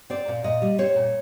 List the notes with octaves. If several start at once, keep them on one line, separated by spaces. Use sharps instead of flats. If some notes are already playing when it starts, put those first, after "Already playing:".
C4 D5
A#2
A#2 D#5
G3
C4 C#5
A#2